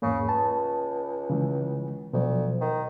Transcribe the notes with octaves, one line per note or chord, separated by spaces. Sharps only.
E2 G#2 C#3 A#3
C#2 A5
C#3 E3 G#3
D2 B2 F3 F#3
D#3